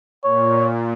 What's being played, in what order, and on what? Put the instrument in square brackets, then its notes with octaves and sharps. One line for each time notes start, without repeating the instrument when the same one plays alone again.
[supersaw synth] A#2 [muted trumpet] C#5